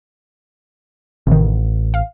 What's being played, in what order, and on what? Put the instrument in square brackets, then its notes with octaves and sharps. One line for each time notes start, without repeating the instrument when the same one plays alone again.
[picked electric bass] A1 [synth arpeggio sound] C3 D#3
[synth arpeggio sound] F5